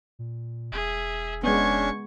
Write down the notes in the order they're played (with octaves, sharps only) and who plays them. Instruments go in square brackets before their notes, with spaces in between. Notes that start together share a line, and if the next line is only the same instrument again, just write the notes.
[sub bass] A#2
[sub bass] E1 [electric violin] G#4 E5
[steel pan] G#3 B3 [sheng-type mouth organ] C#4 D4 [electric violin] C#6 G#6